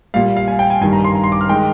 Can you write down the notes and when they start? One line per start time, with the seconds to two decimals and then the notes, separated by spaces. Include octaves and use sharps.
0.14 A#2 G3 F5
0.37 F5
0.48 G#5
0.59 G5
0.70 G#5
0.81 G2 D#3 G3 G#5
0.93 A#5
1.04 C6
1.15 A#5
1.24 C6
1.32 D6
1.41 F6
1.49 D#3 G#3 G5